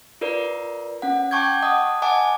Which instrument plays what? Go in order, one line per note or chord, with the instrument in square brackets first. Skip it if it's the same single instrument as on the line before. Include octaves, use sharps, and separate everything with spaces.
[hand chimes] F4 A#4 B4 D5
C#4 F#5
G5 A5 C#6 D6 G6 G#6
D#5 F#5 A5 D#6
D#5 F#5 G#5 A5 D6